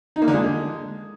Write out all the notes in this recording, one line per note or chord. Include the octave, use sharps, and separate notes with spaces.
D#4
A#3
D3
G#3